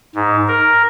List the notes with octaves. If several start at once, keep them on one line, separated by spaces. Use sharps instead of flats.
G#2
A#4